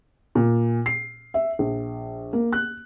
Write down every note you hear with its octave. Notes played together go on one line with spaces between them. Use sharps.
A#2
C7
E5
A#1
A#3
F#6